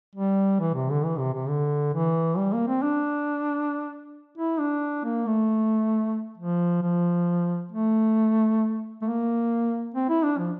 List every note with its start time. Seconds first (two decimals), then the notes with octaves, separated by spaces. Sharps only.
0.15 G3
0.60 E3
0.74 C3
0.90 D3
1.04 E3
1.19 C3
1.34 C3
1.48 D3
1.94 E3
2.37 G3
2.53 A#3
2.67 C4
2.83 D4
4.38 E4
4.60 D4
5.05 A#3
5.26 A3
6.38 F3
6.82 F3
7.72 A3
9.02 A3
9.05 A#3
9.94 C4
10.09 E4
10.24 D4
10.38 F3